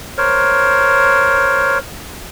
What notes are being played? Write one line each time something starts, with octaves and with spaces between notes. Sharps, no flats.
A#4 C5 C#5